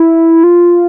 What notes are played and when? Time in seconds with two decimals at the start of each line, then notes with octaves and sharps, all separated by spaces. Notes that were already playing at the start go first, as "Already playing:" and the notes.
Already playing: E4
0.43 F4